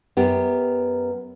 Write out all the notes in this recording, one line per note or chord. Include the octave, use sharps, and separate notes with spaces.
F#2 B3 G4